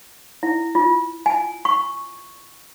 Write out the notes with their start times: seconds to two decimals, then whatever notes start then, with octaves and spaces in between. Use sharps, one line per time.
0.43 E4
0.75 F4
1.26 G#5
1.65 C#6